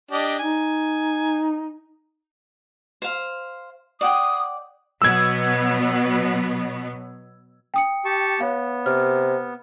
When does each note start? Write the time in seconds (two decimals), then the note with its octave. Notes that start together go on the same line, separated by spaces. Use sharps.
0.11 D4 G4 D#5
0.39 D#4 G#5
3.02 C5 F5
4.01 D5 F#5 G5 D#6
5.02 B2 F#3 B3 E6 G#6
7.74 G5 D#6 C#7
8.05 G4 A5 C#6
8.40 B3 C#5 F5
8.86 C3 F6